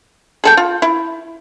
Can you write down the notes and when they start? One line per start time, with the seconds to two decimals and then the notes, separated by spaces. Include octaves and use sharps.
0.44 G#4 A4 G5
0.57 F4
0.82 E4